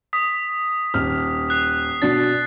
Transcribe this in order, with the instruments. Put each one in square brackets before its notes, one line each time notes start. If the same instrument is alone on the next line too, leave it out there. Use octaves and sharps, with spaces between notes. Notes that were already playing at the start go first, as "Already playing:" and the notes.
[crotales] D#6 B6
[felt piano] D#1 F6
[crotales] D#6 F#6 C7
[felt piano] B2 D4 [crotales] A6 C7